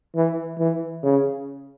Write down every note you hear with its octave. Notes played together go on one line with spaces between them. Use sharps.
E3
E3
C#3